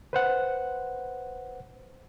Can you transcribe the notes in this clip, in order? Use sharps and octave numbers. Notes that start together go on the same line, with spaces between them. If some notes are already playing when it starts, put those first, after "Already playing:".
B4 C5 F#5